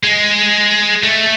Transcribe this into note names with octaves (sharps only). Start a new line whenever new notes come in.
G#3
A3